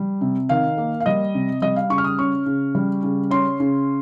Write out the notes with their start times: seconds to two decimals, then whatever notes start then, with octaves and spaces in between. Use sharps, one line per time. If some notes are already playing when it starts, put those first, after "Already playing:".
Already playing: G3
0.21 C3
0.49 D#3 F5
0.77 A#3
1.00 F5
1.06 G3 D#5
1.34 C3
1.62 G3 D#5
1.76 F5
1.90 C#3 C#6
1.98 F6
2.04 D#6
2.19 C#4 C#6
2.46 C#3
2.75 G3
3.03 C#3
3.31 C#4 C6
3.60 C#3